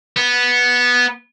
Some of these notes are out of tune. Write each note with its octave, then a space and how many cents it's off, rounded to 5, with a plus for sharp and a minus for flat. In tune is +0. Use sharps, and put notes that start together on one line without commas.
B3 -10